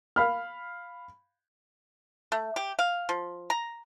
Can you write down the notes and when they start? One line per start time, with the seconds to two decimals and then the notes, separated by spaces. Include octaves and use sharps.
0.16 F5 B5 F6
2.32 A3
2.56 G4
2.79 F5
3.09 F3
3.50 A#5